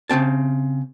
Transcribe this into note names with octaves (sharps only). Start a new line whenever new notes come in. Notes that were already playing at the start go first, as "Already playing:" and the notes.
C#3 F3 C4 A5